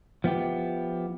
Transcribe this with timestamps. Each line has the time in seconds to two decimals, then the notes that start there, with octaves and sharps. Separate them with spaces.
0.24 F3 B3 E4 G4